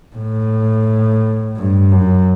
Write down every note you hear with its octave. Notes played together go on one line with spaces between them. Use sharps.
A2
G2
F#2